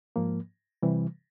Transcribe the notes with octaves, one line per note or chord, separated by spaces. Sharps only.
G#2 F3 A#3
C3 E3 G3